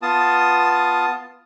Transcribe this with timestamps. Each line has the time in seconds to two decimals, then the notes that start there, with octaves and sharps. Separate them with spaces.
0.02 B3 F4 A5 D#6